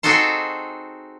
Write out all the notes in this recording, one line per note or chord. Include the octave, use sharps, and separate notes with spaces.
C4 D#4 F#4 G#4 A4 C5